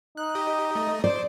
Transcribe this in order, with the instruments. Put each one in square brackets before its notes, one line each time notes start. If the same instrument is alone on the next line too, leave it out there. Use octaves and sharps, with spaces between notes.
[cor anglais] D#4 [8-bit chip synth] F#6
[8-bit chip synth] G4 D#5
A3 D#5
[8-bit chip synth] C5 [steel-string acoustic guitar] D5